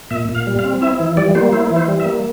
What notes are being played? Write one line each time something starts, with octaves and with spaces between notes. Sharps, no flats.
A#2 E5
A#2
F5
G3
F5
C4
E4 E5
E3
G3 D5
A#3 C5
E4 C5
E3
C5
G3
E5
A#3